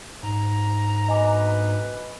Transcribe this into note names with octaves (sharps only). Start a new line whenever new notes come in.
G#2 A#5
D2 B3 B4 D#5 G#5 D6